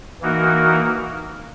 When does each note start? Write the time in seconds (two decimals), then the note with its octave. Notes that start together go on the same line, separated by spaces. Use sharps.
0.21 E3 A#3 D#4 F#4 A#4